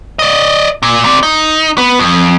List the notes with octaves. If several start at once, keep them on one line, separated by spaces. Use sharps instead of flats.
D5 D#5
A#2
C4 D5
D#4
B3
F2